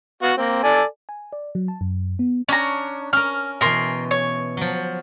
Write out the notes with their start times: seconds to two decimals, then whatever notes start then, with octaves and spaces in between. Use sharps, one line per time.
0.23 B3 F#4 F5
0.37 A#3 C4
0.63 A4 D5 G#5
1.09 G#5
1.33 D5
1.55 F#3
1.68 A5
1.81 F#2
2.19 B3
2.48 C#4 D4 A#5
3.13 C#4 A#4 F6
3.61 B2 E3 A#4 C6
4.11 C#5
4.57 F3 F#3